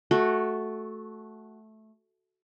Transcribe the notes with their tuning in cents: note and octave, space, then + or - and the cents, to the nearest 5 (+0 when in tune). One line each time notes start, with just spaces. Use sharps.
A3 -10 F#4 +0